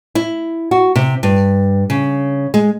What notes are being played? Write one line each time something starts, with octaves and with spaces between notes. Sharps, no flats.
E4
F#4
C3
G2
C#3
G#3